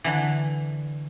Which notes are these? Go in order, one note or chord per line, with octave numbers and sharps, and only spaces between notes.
D3 E3